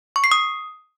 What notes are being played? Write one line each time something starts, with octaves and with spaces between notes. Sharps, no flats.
C#6
C7
D#6